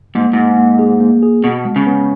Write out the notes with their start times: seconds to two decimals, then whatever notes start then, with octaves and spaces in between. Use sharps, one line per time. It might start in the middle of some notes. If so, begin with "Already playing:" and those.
0.15 G#2 A#3
0.33 G#2 A#3
0.57 A#3
0.79 G#4
1.00 A#3
1.22 G#4
1.43 B2 B3
1.65 G#3
1.76 C#3
1.87 B3